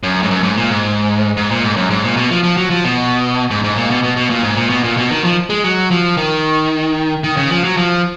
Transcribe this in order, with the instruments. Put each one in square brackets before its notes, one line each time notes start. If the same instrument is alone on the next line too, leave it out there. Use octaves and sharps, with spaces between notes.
[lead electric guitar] F#2
G#2
F#2
G#2
A#2
G#2
G#2
A#2
G#2
F#2
G#2
A#2
B2
F3
F3
F#3
F3
B2
G#2
G#2
A#2
B2
B2
B2
A#2
G#2
A#2
B2
A#2
B2
D#3
F3
G#3
F#3
F3
D#3
D#3
C#3
F3
F#3
F3